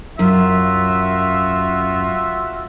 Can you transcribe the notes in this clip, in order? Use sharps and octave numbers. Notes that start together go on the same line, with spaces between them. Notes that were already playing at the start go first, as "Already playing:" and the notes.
F#2 F4 F#4 E5